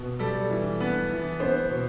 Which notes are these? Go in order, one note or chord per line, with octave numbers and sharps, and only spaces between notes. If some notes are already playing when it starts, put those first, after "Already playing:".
Already playing: B2
G3 A4
E3
B3
E3
B3 C5
B2